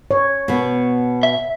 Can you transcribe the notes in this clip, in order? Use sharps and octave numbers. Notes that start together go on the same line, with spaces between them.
C#5
B2 B3
E5